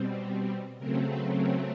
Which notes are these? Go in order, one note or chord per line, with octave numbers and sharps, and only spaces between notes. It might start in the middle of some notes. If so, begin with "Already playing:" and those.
Already playing: B2 G3 C4
C#3 F#3 A3 C4 A#4
B4
A#4